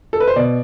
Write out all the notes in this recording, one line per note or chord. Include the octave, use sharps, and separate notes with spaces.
A4
B4
C5
B2 D5